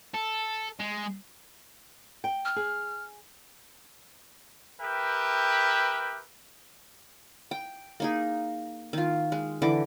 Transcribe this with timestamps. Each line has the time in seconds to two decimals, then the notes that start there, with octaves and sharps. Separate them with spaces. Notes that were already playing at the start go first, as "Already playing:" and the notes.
0.14 A4
0.80 G#3
2.24 G5
2.45 F6
2.56 G#4
4.81 G4 A#4 B4 E5 G5
7.51 G5
8.00 A#3 D#4 G#4
8.93 D#3 F4
9.32 G#3
9.62 D3 E3 D6